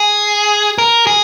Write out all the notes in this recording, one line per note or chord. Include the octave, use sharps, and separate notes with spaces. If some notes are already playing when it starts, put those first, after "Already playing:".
Already playing: G#4
A#4
G#4